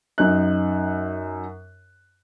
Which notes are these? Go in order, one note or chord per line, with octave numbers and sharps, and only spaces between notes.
F#2 D#4 F#6